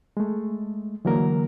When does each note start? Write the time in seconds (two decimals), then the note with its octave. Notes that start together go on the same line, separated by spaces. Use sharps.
0.17 G#3 A3
1.05 D3 E3 F#3 A#3 A#4